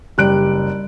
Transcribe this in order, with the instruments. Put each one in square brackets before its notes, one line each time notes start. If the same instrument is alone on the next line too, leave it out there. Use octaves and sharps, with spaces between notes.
[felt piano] F#1 F#6 D7 [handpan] G3 G4